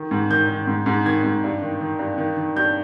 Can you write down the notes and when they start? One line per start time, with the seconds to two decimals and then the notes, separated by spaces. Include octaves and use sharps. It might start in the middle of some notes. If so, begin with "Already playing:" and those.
Already playing: D#3
0.11 G#2
0.30 D#3 G6
0.49 D#3
0.67 G#2
0.86 G#2
1.05 D#3 G#6
1.24 G#2
1.44 G2
1.62 D#3
1.81 D#3
1.99 G2
2.18 D#3
2.37 D#3
2.56 G2 G6